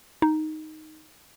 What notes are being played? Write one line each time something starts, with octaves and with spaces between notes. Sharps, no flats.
D#4